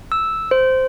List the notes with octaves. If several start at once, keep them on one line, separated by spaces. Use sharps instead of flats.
E6
C5